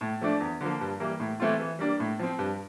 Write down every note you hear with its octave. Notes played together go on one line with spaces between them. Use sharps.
A2
F3 A3 D4
E2
D3 F3 A#3
G2
E3 G3 A#3
A2
E3 A3 C4 F4
E3
G3 A#3 D4
A2
F3 C4
G2